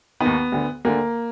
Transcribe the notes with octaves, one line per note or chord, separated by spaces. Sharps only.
D#3 B3
D#2
D2 D3
D2 D3 A#3